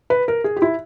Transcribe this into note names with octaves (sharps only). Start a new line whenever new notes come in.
B4
A#4
G#4
G4
E4